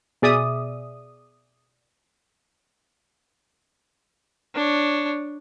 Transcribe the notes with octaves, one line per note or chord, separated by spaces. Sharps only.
B2 G#4 D5 E5 D#6
D4 C#5